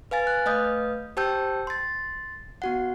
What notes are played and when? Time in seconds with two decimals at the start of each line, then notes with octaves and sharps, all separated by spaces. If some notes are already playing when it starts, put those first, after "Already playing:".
0.11 B4 F5 G#5 A6
0.27 F#6
0.46 A3 B4 D#5 F5 D#6 G6
1.17 G4 C5 G5 A5 E6 G6
1.67 C6 A6
2.62 B3 F#4 F#5